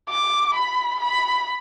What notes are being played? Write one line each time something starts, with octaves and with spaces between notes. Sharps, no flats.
D6
B5
B5